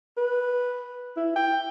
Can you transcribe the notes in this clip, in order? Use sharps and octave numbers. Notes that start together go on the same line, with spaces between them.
B4
E4
G5